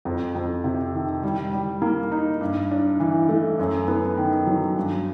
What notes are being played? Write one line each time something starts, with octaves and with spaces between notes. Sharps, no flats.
F2
F2
C3
D#3
G3
G3
A#3
D#4
G2
D4
E3
A3
F#2
B3
D#3
F#3
G2